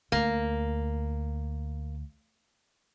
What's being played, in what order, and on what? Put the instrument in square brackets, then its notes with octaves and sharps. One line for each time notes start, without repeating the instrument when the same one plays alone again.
[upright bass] D2 [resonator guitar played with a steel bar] A#3